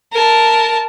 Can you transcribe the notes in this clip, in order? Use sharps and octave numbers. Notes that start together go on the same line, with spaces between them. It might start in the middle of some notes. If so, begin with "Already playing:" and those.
A#4 A5